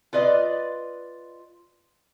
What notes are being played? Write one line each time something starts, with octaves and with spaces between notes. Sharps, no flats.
F4 B4 D5 D#5